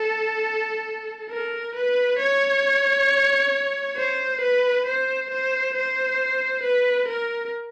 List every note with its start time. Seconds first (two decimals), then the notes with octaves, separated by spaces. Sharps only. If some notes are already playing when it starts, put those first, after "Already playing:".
Already playing: A4
1.30 A#4
1.75 B4
2.19 C#5
3.96 C5
4.41 B4
4.86 C5
5.30 C5
5.74 C5
6.63 B4
7.08 A#4